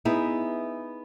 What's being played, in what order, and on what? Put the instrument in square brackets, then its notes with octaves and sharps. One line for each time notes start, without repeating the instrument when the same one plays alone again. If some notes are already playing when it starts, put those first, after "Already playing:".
[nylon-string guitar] B3 D#4 E4 G#4